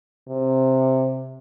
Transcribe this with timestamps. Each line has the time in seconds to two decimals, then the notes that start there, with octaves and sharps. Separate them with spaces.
0.28 C3